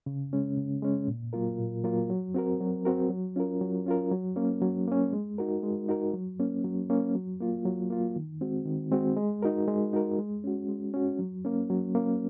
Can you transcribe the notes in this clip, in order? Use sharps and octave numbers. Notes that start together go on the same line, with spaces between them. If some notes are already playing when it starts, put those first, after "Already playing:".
C#3
G#3 C#4
C#3
G#3 C#4
A#2
F#3 A#3 F4 A#4
A#2
F#3 A#3 F4 A#4
F#3
C4 F#4 A#4
F#3
C4 F#4 A#4
F#3
C#4 F4 A#4
F#3
C#4 F4 A#4
F#3
A#3 C#4
F#3
A#3 C#4
G#3
D#4 F#4 A#4
G#3
D#4 F#4 A#4
F#3
A#3 C#4
F#3
A#3 C#4
F#3
A#3 F4
F#3
A#3 F4
D#3
G#3 C4 F#4
D#3
G#3 C4 F#4
G#3
D#4 F#4 A#4
G#3
D#4 F#4 A#4
G#3
C#4 F#4
G#3
C#4 F#4
F#3
A#3 C#4
F#3
A#3 C#4